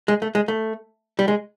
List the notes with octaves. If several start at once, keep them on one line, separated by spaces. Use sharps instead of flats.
G#3
A3
G#3
A3
G3
G#3